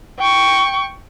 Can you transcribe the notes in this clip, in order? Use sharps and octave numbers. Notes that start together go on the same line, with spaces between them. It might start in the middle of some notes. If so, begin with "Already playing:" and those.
G5 C#6